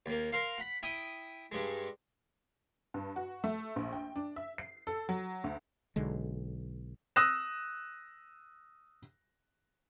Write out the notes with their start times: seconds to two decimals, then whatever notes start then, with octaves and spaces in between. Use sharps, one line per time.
0.06 D#2 A#3
0.32 A#4 C5 F5
0.58 F#5 B5
0.83 E4 G5 D#6
1.52 G2 G#3
2.94 G2
3.16 F#4
3.44 A3
3.76 A#1
3.93 G5
4.16 D4
4.36 E5
4.58 C7
4.87 A4
5.09 F#3
5.44 D2
5.96 B1 D3 G#3
7.16 D#6 E6 F#6 A#6 E7